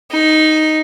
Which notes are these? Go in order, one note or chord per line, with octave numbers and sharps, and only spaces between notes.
D#4